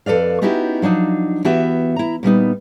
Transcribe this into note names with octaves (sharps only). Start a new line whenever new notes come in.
F2 A4 B4 D5 F5
B3 C#4 D#4 E4 F#4 G4
F3 F#3 D4 D#4
E3 B3 F#4 G4 E5
E4 A#5
A#2 G3 B3 D#4